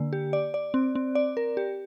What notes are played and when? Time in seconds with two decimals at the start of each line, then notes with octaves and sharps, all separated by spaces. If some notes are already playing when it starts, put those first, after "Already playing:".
Already playing: D3 A#3
0.13 G4
0.33 D5
0.54 D5
0.74 C4
0.95 C4
1.15 D5
1.37 A#4
1.57 G4